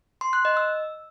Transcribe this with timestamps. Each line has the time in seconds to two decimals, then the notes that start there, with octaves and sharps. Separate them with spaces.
0.21 C6
0.33 F#6
0.45 D#5
0.57 E6